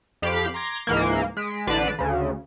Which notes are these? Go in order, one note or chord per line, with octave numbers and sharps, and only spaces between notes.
F2 G4 F5 B5
A#5 C6 D6 G#6 A#6
C#2 G#2 E3 A#3
G#3 B6 D7
A1 D3 B4 D5 C7 E7
D2 C#3